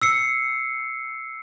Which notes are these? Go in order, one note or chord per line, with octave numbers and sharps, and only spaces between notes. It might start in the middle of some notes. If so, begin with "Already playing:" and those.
E6 C7 C#7